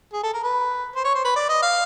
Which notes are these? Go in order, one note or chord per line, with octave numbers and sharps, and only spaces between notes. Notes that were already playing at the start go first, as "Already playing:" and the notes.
G#4
A4
A#4
B4
C5
C#5
C5
B4
D5
D#5
F5